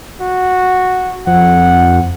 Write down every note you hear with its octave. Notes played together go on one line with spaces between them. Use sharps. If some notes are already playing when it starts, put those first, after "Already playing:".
F#4
F2 F#5